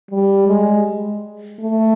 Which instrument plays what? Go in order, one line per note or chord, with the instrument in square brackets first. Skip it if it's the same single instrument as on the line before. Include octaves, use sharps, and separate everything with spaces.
[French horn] G3
G#3
A3